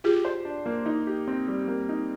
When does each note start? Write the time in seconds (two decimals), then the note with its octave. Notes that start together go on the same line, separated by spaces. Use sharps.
0.04 F4 G4 G#4
0.25 C5
0.45 D4
0.66 A#3
0.86 D#4
1.07 G4
1.28 C4
1.48 G3
1.68 A#3
1.89 D#4